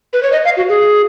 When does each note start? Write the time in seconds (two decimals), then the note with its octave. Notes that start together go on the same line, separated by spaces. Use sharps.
0.13 B4
0.23 C#5
0.32 D#5
0.45 F5
0.57 F#4
0.69 G#4